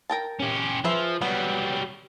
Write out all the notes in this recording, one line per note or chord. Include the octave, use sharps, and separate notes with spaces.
A#4 G5 A5
C#4 G4
F3 G#4 B4 E5
F#3 G3 B3